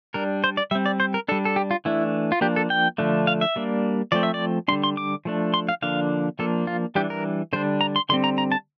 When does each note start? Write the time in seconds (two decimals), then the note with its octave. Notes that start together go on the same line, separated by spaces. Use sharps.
0.14 G3 D4 A#4
0.44 C5
0.57 D5
0.71 G3 C4 E5
0.86 D5
1.00 C5
1.14 A#4
1.28 G3 D4 A4
1.45 A4
1.56 G4
1.71 F4
1.85 E3 A3 D4 E4
2.32 F4
2.41 F3 A#3 D4 G4
2.56 A4
2.70 G5
2.98 D3 F3 A3 D4
3.27 F5
3.41 E5
3.56 G3 A#3 D4
4.12 F3 A3 C4 D5
4.23 E5
4.34 D5
4.68 D3 G3 D4 C6
4.84 C6
4.97 D6
5.25 F3 A3 D4
5.54 C6
5.69 F5
5.82 D3 F3 A#3 D4 F5
6.39 F3 A#3 D4 A4
6.67 F4
6.95 E3 G3 D4 G4
7.10 A#4
7.53 D3 G3 D4 C5
7.81 A#5
7.96 C6
8.09 D3 G3 C4 C6
8.24 A#5
8.38 A#5
8.52 A5